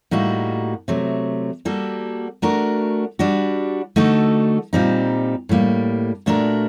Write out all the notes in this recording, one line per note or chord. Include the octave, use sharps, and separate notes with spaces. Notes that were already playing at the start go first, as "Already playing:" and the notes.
A2 G3 A#3 D#4 F#4
C3 F#3 A3
G3 A#3 F#4 A4
A3 D4 F#4 A#4
G3 D4 F#4
D3 A3 D#4 F#4 A4
A#2 G3 C4 D#4
A2 G3 A#3
A#2 A3 D4 F#4 A#4